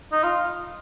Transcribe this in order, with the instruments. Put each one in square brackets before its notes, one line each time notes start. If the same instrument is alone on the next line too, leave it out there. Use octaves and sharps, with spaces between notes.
[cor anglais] D#4
F4